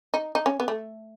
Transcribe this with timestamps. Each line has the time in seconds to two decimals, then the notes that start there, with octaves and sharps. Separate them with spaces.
0.14 D#4
0.35 D#4
0.46 C#4
0.60 B3
0.68 A3